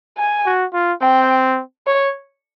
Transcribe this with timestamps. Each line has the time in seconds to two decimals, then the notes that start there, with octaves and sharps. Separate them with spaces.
0.18 G#5
0.46 F#4
0.73 F4
1.02 C4 G5
1.86 C#5